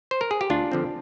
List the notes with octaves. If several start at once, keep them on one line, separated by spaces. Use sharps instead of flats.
C5
A#4
G#4
G4
D2 D4 F4
D3 F3 C4